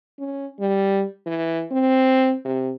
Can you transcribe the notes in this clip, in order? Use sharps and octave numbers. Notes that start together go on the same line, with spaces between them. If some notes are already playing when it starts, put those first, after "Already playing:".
C#4
G3
E3
C4
C3